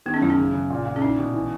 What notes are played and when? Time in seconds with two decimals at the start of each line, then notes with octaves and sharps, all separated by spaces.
0.06 D#3 B3
0.14 C#4
0.22 F#2 E4
0.30 C#4
0.38 C#3
0.54 C#3
0.70 A#2
0.86 A#2
0.96 C#4
1.02 D#4 E4
1.18 B2
1.34 E3